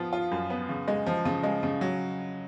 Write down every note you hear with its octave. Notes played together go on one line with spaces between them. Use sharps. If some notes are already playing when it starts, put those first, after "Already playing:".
Already playing: F3 B3 F4
F4
F#2
B3
C#3
G#3
F3
C#3
G#3
C#3
F#3